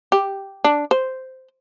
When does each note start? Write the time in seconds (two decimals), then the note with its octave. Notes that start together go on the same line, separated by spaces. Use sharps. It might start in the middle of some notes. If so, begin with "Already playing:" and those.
0.12 G4
0.64 D4
0.91 C5